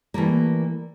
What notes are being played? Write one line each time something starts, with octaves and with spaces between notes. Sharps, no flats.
E3 G3 A3 A#3